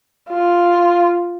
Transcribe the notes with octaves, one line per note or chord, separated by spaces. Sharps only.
F4